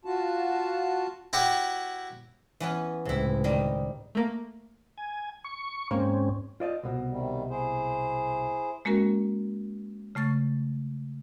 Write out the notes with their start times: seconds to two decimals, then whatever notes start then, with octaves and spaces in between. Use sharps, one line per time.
0.05 F4 F#4 A5
1.33 E4 F#4 G4 C#5 G5
2.60 E3 B3 C#4
3.05 C#2 A2 C3 E4
3.44 D#3 G3 D#5
4.15 A3 A#3
4.98 G#5
5.44 C#6
5.91 G#2 A#3 C4 C#4
6.60 F4 D5 D#5
6.83 C2 B2
7.10 C3 D#3 G3
7.50 E4 G#4 C5
8.85 G#3 A#3 C#4 F#4 A#4
10.15 C#3 A3 C#6 A6